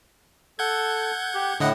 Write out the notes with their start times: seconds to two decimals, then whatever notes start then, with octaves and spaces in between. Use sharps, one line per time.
0.59 A4 F#5 G6 G#6
1.35 G4
1.60 A2 D3 D#5 F#5